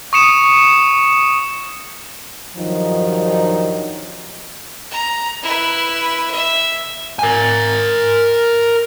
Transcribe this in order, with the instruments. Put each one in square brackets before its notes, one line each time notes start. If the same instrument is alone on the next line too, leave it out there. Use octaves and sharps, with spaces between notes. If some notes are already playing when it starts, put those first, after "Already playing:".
[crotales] C#6 D#6 C#7 E7
[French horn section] G2 D#3 F3 F#3 D#4
[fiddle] A#5
E4 B4
E5
[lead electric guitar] A#4 G#5